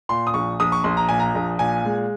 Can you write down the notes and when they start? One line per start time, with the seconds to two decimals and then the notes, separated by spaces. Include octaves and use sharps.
0.09 A#2 C6
0.27 D#6
0.34 A#1 C#6
0.60 A#1 D#6
0.72 C#6
0.84 A#1 C6
0.97 A#5
1.09 A#2 G#5
1.19 A#5
1.35 A#1
1.59 A#2 G#5
1.85 G#3